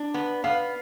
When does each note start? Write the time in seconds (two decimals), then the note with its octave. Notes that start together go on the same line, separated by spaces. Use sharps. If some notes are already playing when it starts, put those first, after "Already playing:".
Already playing: D4
0.14 B3
0.44 B3 F5